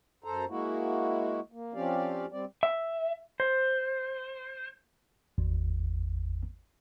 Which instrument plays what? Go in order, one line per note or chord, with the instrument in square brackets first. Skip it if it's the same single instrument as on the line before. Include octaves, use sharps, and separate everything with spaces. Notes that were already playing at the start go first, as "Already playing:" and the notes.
[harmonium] F#2 A4 C5 A#5
G#3 A#3 E4 F#4
A#3
F3 C4 C#4 G4 D5 F5
G3 C4 D5
[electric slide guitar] E5
C5
[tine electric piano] G#1 E2